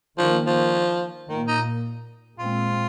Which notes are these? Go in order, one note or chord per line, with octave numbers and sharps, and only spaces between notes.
D#3 F3
A#3
F3
A#2 D#3 A#3
D#4
A#2 G#3 C4 F4